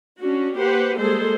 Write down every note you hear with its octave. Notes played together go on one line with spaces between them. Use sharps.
C#4 D4 F#4
A#3 G4 B4 C5 F#5
G3 G#3 A#3 G#4 A4 C5